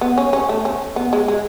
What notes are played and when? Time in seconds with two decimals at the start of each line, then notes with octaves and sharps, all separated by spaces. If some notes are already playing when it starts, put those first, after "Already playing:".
0.01 B3
0.18 C#4
0.33 C#4
0.49 A3
0.65 C#4
0.96 B3
1.13 G#3
1.28 G#3